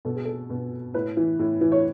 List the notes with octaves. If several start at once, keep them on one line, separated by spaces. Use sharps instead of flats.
B2 A4
G#4
A4
B2
A2 B4
E3
A2
E3
C#5